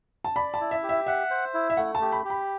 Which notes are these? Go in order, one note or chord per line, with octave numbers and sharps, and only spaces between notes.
A5
D5 B5
A5
E4
E5
G4
E5
E5 F#5
C5
E4
E5
A3 F#5
A5
G4
B5
G4
B5